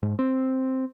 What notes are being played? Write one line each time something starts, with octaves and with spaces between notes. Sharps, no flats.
G#2
C4